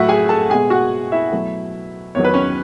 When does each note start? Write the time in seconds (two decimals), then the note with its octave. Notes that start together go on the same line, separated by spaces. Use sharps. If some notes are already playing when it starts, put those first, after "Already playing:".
Already playing: A2 F#3 A3 E4 F#4 E5 F#5
0.08 G#4 G#5
0.29 A4 A5
0.50 B2 G#3 G#4 G#5
0.70 F#4 F#5
1.12 E4 E5
1.32 B2 F#3 A3
2.15 E2 D#3 F#3 C#5
2.24 B4
2.34 C#4 C#5